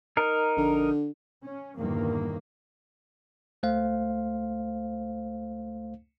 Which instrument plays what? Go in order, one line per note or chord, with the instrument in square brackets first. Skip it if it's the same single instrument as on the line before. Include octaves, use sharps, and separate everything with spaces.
[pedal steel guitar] D#4 A#4
[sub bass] A#1 [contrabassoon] D3
[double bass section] C#4
G1 E2 G2 A#2 D#3 A#3
[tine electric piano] C#2 A3 C5 F5